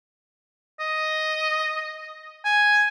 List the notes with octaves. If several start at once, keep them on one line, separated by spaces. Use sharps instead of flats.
D#5
G#5